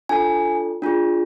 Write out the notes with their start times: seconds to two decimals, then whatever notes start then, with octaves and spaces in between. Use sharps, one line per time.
0.09 D4 F4 A4 G#5
0.82 D4 F4 G#4